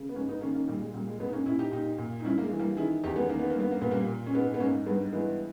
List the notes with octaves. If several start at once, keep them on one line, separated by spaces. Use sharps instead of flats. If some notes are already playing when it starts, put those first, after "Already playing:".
Already playing: C#3
B3
G#2 A#3 C#4
B3 D#4
D#3 A#3 C#4
A#3 C#4
A#2 G3 A#3
G#3
A#2 G3
G#3
A#2 G#3 B3
D#4
A#3 C#4
A#2 C#4 E4
D#4 G4
A#2 D#4 G4
A#2
D#4
G2 C#4 E4
A#3
G#3
E3
G3 A#3
D#3 E4 G#4
E2 D#4 G4
G#3 B3
D#3 A#3
B3
A#3
G2 B3
A#3
A#2 B3
G3 A#3
A#2
C#4
G#2 G#3 B3
B3
G#2 A#3 C#4
G2 G#3 B3
E3 G#3 B3